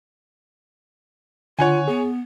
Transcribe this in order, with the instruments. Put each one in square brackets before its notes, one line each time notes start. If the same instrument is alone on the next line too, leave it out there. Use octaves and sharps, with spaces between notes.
[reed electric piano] D3 [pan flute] F4 [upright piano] C#5 F#5 G#5
[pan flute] B3 [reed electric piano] G#4